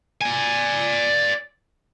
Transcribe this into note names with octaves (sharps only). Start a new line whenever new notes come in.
D5 G#5